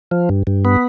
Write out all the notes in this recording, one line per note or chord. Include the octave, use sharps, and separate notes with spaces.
F3
G2
G2
B3